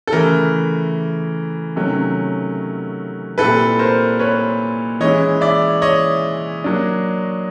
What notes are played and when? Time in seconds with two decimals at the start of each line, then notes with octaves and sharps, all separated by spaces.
0.07 A4
0.12 C#3 E3 A3 A#4
1.75 C3 D#3 F#3 A3 C#4
3.38 A#2 G3 C4 E4 A4 B4
3.79 A#4 C5
4.19 B4 C#5
5.00 E3 G#3 C#4 E4 C#5 D#5
5.41 D5 E5
5.82 C#5 D#5
6.64 F#3 A#3 D4